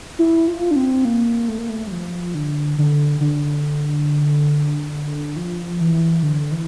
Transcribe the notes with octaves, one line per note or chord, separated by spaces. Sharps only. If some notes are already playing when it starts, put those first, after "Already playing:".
E4
F4
D4
C4
A#3
A3
A#3
A3
G3
F3
D3
D3
D3
F3
E3
D3
E3